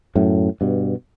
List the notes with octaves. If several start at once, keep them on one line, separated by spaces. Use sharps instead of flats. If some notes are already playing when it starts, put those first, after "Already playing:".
F#2 A2
G2 B2